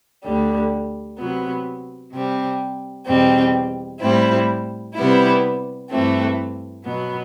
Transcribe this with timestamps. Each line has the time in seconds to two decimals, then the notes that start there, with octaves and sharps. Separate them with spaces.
0.24 D2 D3 G3
1.18 C3 F#3 B3
2.12 C3 G3 C4
3.07 E2 B2 G3 C4
4.01 A2 G3 C4 E4
4.95 C3 G3 B3 E4
5.90 G2 E3 A3 C4
6.84 B2 F#3 B3